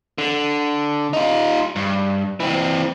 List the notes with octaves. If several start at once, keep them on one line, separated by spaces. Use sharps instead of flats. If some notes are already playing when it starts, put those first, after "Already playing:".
D3
D#4 F4
G2
E3 C4